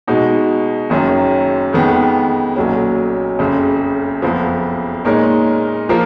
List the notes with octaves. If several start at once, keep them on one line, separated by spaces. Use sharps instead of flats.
B2 G#3 D#4 F#4
F#1 F#2 D#3 F#3 C#4
F2 D#3 G#3 B3
B1 A#2 F#3 C#4
F#1 F2 C#3
F#1 F2 F3 B3
A#2 G#3 D#4 A#4 C#5
F3 A#3 F4 A#4